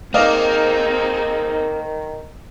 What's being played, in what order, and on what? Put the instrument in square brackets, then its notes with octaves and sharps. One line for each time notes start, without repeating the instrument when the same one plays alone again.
[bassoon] D#3 [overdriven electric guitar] A#3 [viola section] C4 D#4 G#4 [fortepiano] D5 D#5 F5